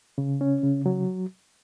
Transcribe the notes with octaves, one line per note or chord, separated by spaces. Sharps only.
C#3
C#4
C#3
F#3